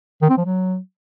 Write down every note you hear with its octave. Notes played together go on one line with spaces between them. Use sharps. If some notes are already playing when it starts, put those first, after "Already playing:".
D#3
C4
F3
F#3